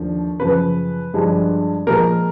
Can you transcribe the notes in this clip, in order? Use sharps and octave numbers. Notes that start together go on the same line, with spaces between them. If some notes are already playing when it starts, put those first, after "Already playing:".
Already playing: D#2 D3 F3
F#2 C#3 F3 B4
G2 D3 F3 G#3
A#2 F3 G#3 A#4